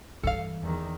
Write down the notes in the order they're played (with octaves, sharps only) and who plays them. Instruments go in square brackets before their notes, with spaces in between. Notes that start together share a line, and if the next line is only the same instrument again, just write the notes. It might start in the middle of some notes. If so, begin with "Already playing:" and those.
[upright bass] G2 E3 [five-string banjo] A4 F5
[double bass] E2 D#3